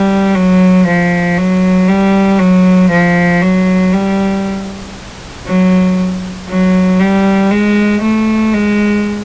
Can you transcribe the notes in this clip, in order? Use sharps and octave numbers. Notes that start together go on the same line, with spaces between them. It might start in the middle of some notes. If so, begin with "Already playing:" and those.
Already playing: G3
F#3
F3
F#3
G3
F#3
F3
F#3
G3
F#3
F#3
G3
G#3
A3
G#3